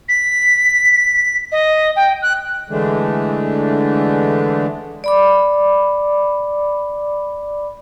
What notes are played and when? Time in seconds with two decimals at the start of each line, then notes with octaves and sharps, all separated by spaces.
0.09 B6
1.52 D#5
1.96 G5
2.22 F#6
2.70 D3 E3 G#3 A3 D4
5.04 D5 B5 D6